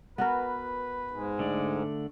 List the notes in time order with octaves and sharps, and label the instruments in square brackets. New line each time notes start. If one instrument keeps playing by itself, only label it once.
[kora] B3 F#4 A#4 [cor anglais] B4
[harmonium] G#2
[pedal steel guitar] D3 A3 D5